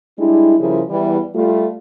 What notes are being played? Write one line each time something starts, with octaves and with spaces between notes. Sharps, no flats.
G3 G#3 D4 E4
C#3 F3 G3 E4 G#4 A#4
E2 E3 G3
G3 A3 F4